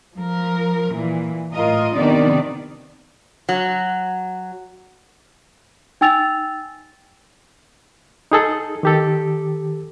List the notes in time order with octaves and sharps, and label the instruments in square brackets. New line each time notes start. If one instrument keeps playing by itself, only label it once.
[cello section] F3 A#4
A#2 E3
A2 F4 A#4 D#5
C3 D#3 B3 D4 D#4 D5
[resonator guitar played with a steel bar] F#3
[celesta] D#4 G5 G#5 E6 A6 F7
[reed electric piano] D#4 G#4 A4
D#3 G4 A4